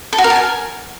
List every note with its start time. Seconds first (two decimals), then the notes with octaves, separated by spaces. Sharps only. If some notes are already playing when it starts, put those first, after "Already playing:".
0.13 A4
0.18 F#4
0.24 A#4
0.30 A5
0.36 G#5